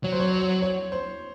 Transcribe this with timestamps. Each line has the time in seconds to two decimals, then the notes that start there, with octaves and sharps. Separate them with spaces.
0.04 F#3 C#5
0.12 C5
0.20 C#5
0.33 C#5
0.62 C#5
0.92 C5